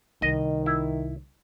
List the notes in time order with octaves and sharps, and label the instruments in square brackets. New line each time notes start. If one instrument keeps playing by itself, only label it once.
[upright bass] C2 [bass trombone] D#3 [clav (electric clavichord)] D#5
[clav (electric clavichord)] E4